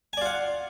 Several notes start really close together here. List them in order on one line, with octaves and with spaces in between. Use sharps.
G#5 D5 F4 F#5